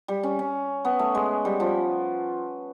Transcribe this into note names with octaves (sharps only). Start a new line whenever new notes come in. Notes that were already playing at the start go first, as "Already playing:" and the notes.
G3
C#4
C#4
B3
A3
G#3
G3
F3